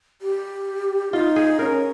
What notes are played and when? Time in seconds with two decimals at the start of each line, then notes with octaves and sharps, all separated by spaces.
0.22 G4
1.13 D#4 F4
1.36 G#4
1.59 C#4 A#4